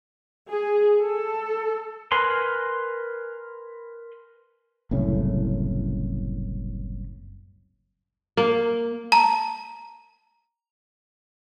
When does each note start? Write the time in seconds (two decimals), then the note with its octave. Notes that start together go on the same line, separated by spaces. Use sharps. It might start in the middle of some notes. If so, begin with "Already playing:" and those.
0.49 G#4
1.01 A4
2.12 A#4 B4 G#5 C6
4.91 F#1 C2 A2 C#4
8.37 A#3
9.12 A5 A#5